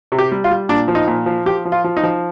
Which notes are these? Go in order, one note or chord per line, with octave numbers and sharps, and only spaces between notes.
C3
G4
G3
F4
G3
A#2 D4
F3
D#4
A#2
F3
F3 G4
F3
F4
F3
D#4
F3